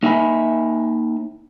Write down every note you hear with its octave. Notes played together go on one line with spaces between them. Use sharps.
A#3 D#4 E4 E5 G#5 B5